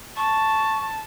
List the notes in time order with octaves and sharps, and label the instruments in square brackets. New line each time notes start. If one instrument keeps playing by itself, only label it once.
[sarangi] A5 [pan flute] C#6